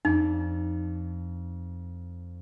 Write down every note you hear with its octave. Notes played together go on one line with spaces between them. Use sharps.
F2 D4 D#4